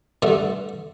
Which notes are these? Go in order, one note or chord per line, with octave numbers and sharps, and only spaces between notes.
G2 D3 A3